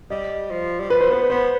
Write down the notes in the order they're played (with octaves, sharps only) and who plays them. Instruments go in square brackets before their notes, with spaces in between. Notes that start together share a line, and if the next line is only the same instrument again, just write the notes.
[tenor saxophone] G3 [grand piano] D#5
[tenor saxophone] F3
G3
[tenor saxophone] F3 [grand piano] B4
[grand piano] C5
[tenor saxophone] B3 [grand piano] B4
[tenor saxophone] B3 [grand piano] C5